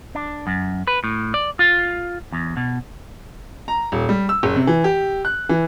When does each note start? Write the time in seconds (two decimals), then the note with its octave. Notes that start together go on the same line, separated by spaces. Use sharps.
0.15 D4
0.47 F#2
0.87 B4
1.04 A2
1.34 D5
1.59 F4
2.32 E2
2.57 B2
3.68 A#5
3.92 D#1
4.09 G3
4.29 E6
4.43 F#1
4.56 C3
4.67 E3
4.84 G4
5.25 F#6
5.49 E3